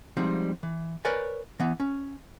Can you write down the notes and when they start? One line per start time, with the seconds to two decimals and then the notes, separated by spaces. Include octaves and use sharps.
0.17 F3 G3 G#3 C4 D#4
0.63 E3
1.05 A#4 B4 C#5 D5 G#5
1.60 E3 B3
1.80 C#4